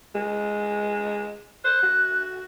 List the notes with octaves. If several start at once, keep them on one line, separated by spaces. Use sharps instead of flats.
G#3
C5 F#6
F#4